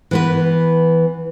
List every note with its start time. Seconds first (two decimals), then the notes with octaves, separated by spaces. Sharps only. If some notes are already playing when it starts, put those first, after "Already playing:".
0.11 E3 B3 B4